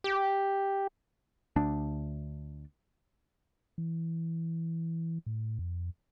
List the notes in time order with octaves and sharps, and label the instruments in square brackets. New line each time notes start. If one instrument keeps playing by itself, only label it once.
[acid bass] G4
[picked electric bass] D2 D4
[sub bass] E3
A2
F2